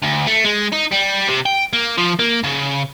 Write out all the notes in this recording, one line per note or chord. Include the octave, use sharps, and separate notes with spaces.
D2
A3
G#3
D#4
G3
C3
G5
A#3
F3
A#3
C#3